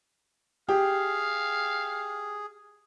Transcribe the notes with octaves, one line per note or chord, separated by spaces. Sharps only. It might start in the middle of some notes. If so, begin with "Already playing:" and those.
G4 G#4 F5